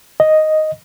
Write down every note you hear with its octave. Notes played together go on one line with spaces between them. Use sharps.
D#5